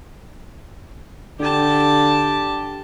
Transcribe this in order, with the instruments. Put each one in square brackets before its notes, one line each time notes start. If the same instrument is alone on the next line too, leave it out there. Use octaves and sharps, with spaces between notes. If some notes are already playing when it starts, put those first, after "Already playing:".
[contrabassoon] D3 [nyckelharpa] G4 A5